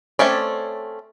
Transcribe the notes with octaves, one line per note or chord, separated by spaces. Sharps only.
A3 C4 C#4 D5